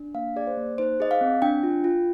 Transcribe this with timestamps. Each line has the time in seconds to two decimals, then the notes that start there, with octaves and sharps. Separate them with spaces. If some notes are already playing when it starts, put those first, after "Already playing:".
Already playing: D4
0.15 A#3 F5
0.36 G#4 D5
0.47 C5
0.57 A#3
0.78 D#4 C5
1.00 G#4 D#5
1.11 F5
1.21 C4
1.42 D4 G5
1.63 F4
1.84 F4